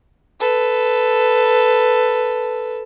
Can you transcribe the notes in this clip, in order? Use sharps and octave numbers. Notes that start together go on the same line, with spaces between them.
A4 B4